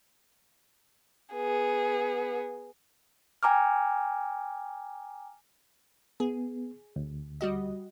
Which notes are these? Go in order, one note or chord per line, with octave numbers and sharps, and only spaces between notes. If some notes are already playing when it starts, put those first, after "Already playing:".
B3 G#4
G5 G#5 A#5 D6 F6
B3 G#4
D2
G3 F#4 D#5